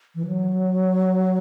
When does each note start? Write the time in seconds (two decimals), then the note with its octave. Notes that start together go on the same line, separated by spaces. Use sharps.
0.15 E3
0.27 F#3